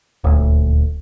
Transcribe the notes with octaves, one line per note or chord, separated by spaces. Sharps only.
D#1 D2